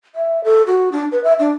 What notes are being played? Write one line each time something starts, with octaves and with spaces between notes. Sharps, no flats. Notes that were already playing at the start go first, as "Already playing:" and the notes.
E5
A4
F#4
D4
B4
E5
D4